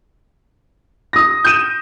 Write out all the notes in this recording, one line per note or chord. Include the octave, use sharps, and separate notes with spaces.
D#6 A#6
G6 D#7 E7